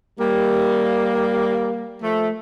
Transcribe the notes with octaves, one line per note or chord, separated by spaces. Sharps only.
G3 A#3
F3 A3